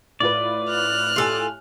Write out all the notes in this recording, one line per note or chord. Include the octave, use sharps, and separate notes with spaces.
A2 F4 B4 D5
F6 F#6
A2 F4 G4 A4 G#5